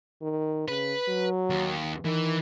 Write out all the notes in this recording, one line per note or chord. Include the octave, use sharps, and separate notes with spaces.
D#3
C#3 B4
F#3
D#2
D#3 E3